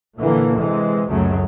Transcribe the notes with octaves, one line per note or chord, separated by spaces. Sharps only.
A#2 D3 E3 A#3
C3 E3 G#3
C#2 F#2 C#3 F#3 A3